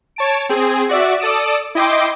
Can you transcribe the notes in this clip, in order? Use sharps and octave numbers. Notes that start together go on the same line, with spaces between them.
C#5 A5 D7
C4 G#4
F#4 D5 E5
A4 D5 D#6 D7 E7
E4 D#5 G5 C6 D6